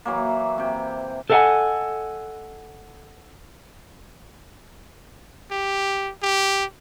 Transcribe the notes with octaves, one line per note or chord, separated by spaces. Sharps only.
E3 F#3 A#3
C3 G5
A4 A#4 D#5 F5 F#5 G#5
G4
G4